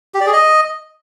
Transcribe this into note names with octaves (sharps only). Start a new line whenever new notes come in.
G4
D5
G#4
D#5